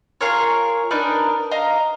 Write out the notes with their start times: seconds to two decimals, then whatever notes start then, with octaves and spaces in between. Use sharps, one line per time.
0.21 F4 G#4 A#4 C#5
0.91 D4 D#4 A#4 B4
1.51 D#5 F5 A#5